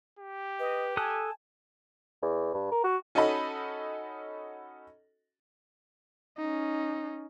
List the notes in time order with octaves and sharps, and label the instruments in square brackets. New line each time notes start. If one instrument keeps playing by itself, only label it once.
[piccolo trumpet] G4
[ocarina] B4 [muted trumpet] D#5
[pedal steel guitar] A4 D#6 F#6 [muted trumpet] G#5 [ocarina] A5
[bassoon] E2
G2
A#4
F#4
[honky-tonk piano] C#4 D#4 F#4 A4 D#5 B5
[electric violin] C#4 D#4